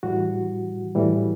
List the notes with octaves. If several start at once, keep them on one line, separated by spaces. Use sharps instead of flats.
A2 E3 G3 F#4
A2 E3 G3